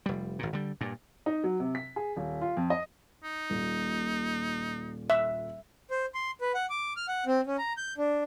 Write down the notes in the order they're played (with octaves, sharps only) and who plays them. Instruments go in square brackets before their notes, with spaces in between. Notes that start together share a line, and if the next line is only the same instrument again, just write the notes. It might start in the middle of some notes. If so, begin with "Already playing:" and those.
[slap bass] F1 G3
G#1 A#2
D3 G3
G2 A#2
[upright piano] D#4
F#3
C3
B6
G#4
D#1
F4
F2
D#5
[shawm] D#4
[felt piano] D#1 A#2
[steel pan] E5
[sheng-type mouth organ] C5
C6
B4
F#5
D6
F6
F#5
C4
C#4
A#5
G6
D4